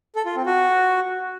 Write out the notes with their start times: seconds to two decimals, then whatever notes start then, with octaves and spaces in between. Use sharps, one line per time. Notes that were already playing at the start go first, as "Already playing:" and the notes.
0.15 A4
0.26 F4
0.36 C4
0.46 F#4